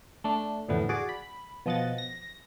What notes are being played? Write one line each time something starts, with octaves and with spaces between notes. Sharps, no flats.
A3 D4
F2 A2 D3 E3 B3
F#4 G#4 D5 D6
B5
B2 F3 D#5 F#5 A6
A#6